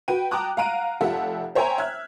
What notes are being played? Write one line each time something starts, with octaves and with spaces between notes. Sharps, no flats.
F#4 B4 G5 D#7
G5 A5 A#5 D6 D#6 F#6
F5 F#5 A#5 F#6 D7 D#7
F1 F4 G4 A4 E5 F#5
C5 C#5 E5 G5 G#5 A#5
E5 F6 F#6 G#6